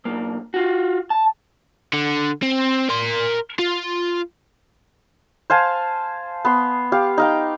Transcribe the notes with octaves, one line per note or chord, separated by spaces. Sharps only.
B1 A#3
F4 F#4
A5
D3
C4
A#4 C6
F4
C5 F5 G#5 A5
B3 C6
G4 F5
D#4 F5 G5